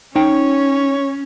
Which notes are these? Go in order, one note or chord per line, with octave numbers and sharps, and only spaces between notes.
C#4 D#4 C#5 G5